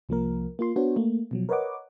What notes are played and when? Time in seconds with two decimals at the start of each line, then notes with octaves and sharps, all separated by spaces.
0.09 C2 F3 A#3 A#4
0.59 A#3 F4 C6
0.76 B3 D4 F#4 C5 C#5
0.96 A3 A#3
1.31 B2 F3 F#3
1.49 A#4 B4 C#5 D#5 F#5 D6